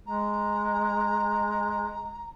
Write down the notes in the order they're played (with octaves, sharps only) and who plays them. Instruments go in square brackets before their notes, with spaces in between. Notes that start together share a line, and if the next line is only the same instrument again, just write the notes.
[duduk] G#3 [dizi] A#5